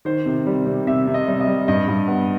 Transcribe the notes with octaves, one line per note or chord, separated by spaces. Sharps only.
D#3 C5
C3
G3
C3
C3 E5
C3
D#5
G3
D#5
G3
G2 D#5
G2
B3